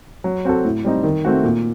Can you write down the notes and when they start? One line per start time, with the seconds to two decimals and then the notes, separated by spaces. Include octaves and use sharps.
0.24 F#3
0.45 C4 F#4 A4
0.65 A2
0.85 G3 C4 D#4
1.04 D#3
1.25 A3 C4 F#4
1.44 A#2